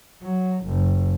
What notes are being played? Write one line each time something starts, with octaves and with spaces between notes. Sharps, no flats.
F#3
F#1